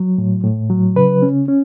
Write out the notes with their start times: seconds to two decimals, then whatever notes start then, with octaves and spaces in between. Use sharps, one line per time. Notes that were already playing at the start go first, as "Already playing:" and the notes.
Already playing: F#3
0.18 A2
0.44 A2
0.70 F#3
0.96 C#3 B4
1.22 C#4
1.48 C#4